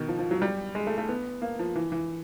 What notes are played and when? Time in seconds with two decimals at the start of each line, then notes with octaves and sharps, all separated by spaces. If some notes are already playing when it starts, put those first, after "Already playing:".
Already playing: B2 D#3
0.08 F3
0.19 F3
0.31 F#3
0.42 G3
0.75 G#3
0.87 A3
0.98 A3
1.09 B3
1.42 A#3
1.59 F3
1.76 E3
1.92 E3